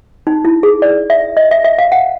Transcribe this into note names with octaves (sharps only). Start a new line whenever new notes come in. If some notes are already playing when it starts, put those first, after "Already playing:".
D#4
E4
G#4
D5
E5
D#5
E5
E5
F5
F#5